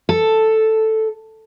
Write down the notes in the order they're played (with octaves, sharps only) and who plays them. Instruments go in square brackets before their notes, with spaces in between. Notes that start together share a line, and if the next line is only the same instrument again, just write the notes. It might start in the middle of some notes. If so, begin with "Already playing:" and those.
[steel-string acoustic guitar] A4